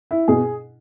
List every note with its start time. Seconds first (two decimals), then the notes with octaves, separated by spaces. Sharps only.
0.11 E4
0.28 B2 G#4